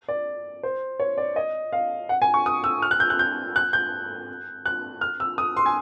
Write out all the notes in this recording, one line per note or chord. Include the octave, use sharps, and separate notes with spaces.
D5
C5
C#5
D5
D#5
F5
F#5
G#5
C#6
D#6
E6
F6
F#6
G6
F#6
G6
F#6
G6
F#6
F6
E6
D#6
C6
G#5